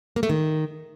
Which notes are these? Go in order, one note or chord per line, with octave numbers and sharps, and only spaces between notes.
A#3
A3
D#3